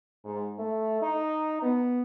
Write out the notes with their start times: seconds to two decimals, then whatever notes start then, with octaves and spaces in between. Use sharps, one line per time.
0.25 G#2
0.58 A3
1.02 D#4
1.62 B3